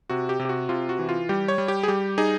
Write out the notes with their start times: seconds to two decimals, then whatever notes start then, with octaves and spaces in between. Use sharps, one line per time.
0.10 C3 F#4
0.29 G4
0.40 C3
0.45 G4
0.49 F#4
0.69 C3 F4
0.89 F#4
0.99 E3
1.09 F4
1.29 G3 G4
1.48 C#5
1.58 G3
1.68 G4
1.83 G#4
1.88 G3 G4
2.18 D#4 G#4